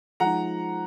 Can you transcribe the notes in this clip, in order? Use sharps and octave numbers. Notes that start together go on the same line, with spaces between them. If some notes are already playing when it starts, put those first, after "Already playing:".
F3 G#3 D#4 F#5 A#5